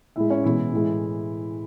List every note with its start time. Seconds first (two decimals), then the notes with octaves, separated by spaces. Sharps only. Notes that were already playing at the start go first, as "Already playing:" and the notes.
0.16 A2 G#3 E4 E5
0.30 C#4 C#5
0.44 B2 E3 G#3 E4
0.72 A2 G#3